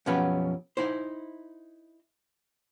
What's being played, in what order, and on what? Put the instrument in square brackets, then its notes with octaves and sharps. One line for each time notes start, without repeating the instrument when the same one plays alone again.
[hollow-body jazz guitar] F#2 B2 F3 C#4 G4 B4
D#4 E4 C5